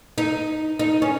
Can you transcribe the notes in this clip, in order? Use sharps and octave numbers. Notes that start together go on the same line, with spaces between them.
D#4
D#4
C#4